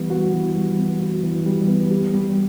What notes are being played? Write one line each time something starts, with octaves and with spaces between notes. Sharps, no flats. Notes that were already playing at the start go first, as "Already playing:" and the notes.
Already playing: E3 G3 B3
F#4
E3
G3
B3
F#4
E3
G3
B3
G4
G3